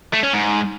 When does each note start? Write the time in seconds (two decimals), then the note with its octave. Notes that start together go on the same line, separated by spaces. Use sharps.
0.13 A3
0.23 C#4
0.33 G#2